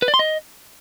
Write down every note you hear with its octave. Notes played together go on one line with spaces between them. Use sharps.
B4
D5
C6
D#5